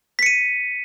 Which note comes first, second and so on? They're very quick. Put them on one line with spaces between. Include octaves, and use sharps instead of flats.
B6 C#7 D#7